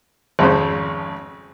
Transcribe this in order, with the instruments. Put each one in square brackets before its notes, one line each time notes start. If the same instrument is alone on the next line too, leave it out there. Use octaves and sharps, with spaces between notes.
[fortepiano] G#1 F2 C#3 C5